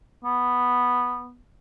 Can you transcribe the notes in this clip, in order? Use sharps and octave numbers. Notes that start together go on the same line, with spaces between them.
B3